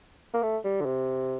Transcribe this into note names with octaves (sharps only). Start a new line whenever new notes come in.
A#3
A3
G3
D3
C3